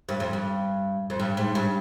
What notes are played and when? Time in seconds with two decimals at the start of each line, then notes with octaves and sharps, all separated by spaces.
0.09 G2
0.20 F2
0.33 G2
1.10 F2
1.19 G2
1.37 G#2
1.55 G2